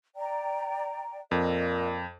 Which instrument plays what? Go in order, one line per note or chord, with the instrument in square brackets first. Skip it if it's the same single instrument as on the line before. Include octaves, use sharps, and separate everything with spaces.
[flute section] D5 G5 A#5
[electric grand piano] F2 [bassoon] A#2 [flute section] A4 D#5